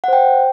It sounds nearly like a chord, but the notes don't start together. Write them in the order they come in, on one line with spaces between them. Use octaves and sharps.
F#5 C5 G5